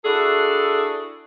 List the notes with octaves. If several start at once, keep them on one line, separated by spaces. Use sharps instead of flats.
D4 E4 F#4 G#4 A4